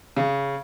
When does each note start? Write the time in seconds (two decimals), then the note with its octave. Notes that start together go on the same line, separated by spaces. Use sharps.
0.17 C#3